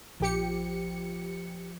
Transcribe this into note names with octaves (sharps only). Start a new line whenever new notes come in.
A#1 F3 G4 C#7